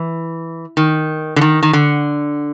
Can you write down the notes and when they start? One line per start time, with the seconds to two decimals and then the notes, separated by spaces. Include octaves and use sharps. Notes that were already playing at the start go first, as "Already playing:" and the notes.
Already playing: E3
0.77 D#3
1.36 D3
1.41 D#3
1.63 D#3
1.73 D3